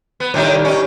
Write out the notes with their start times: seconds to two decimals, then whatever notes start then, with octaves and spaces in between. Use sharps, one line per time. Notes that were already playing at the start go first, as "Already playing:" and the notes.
0.20 B3
0.34 A2 D#3 G3 D#4 A#4 C#5
0.65 C#4 D#4